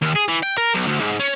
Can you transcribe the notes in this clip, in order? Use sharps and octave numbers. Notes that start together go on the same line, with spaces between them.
D#2
G#4
E3
G5
A#4
B1
D2
G#2
C#4